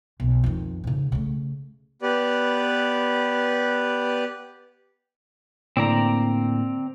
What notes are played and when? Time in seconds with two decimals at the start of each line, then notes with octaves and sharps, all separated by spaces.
0.20 B1
0.44 F2 D#3
0.84 G#2 C#3
1.12 C#3 A3
2.02 B3 G4 B4 D5
5.77 A2 D3 A#3 C4 D5 A#5